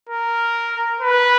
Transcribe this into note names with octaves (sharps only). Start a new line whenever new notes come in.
A#4
B4